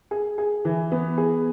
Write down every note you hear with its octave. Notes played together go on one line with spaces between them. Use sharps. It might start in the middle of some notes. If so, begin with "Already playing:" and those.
G#4
G#4
E3
B3
G#4